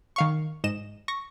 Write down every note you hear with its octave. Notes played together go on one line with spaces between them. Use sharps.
D#3 F5 C#6
G#2 D#5 E7
C#6 A#6